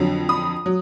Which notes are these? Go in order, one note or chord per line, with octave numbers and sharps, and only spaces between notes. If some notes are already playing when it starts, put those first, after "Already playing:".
Already playing: F2 D3 F#3
B5 D#6
F#3